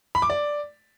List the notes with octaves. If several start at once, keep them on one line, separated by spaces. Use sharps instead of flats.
B5
D6
D5